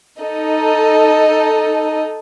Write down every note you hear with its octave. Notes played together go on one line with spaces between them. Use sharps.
D#4 A4 D#5